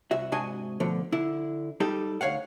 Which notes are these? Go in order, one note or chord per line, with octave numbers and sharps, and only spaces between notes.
C2 F#4 E5
G#2 C3 D4 F#4 D#5 G#5
B2 D3 F3 A3
D3 E4
G3 D#4 G4 A4
D2 C#5 F5 F#5